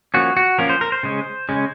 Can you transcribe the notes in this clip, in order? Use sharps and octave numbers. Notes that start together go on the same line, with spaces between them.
F3 A#3 C#4 F#4
F#4
F3 A#3 C#4 A#4
C5
A#4
C5
C#3 G#3 C#4
C#3 G#3 C#4